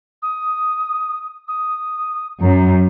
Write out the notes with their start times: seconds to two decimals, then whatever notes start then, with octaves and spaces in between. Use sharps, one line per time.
0.22 D#6
1.48 D#6
2.41 F#2 A#5